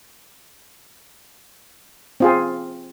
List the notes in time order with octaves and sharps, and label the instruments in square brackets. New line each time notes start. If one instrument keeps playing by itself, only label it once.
[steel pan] C4 F4 G#4